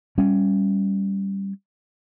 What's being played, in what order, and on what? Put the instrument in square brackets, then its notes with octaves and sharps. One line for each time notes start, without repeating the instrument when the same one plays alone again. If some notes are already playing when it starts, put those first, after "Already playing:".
[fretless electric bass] G3 C#4